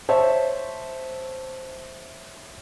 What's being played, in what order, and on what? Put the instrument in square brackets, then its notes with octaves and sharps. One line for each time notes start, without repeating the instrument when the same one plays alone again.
[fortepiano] C5 C#5 E5 A5